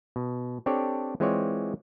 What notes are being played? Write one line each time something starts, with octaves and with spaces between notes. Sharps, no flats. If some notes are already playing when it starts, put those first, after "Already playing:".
B2
C4 D4 G4 A4 C#5 D5
E3 G#3 C4 F4 C#5 D5